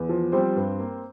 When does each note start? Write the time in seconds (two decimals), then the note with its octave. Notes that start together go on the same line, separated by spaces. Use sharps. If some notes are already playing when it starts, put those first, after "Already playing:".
Already playing: E2
0.09 F3
0.32 G3 C4 C5
0.56 G2
0.80 A#3